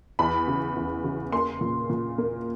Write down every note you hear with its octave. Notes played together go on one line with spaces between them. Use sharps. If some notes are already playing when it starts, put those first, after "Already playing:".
E2 B5
C#3
E2
C#3
A#3 C6
A#2
A#2
A#3